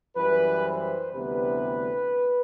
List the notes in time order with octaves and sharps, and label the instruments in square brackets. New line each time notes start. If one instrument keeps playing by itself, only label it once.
[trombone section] F#2 E3 G3 B4
C5
D2 C3 E3 G3 B3 B4